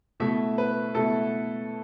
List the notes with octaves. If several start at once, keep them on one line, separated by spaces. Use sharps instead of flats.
B2 A3 E4 E5
B4
B2 A3 E4 A4